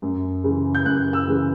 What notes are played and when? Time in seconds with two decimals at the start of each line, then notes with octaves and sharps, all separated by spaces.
0.02 F#2
0.44 C#3 E3
0.75 G6
0.85 F#2 F#6
1.13 E6
1.28 C#3 E3